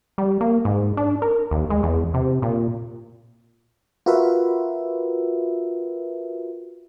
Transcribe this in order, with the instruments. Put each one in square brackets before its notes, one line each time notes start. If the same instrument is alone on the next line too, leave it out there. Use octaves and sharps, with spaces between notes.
[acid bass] G3
A#3
G#2
D4
A#4
D#2
G#3
E2
C3
A#2
[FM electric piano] F4 F#4 A#4 B4 E5